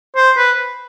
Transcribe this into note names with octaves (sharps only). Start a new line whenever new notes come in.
C5
B4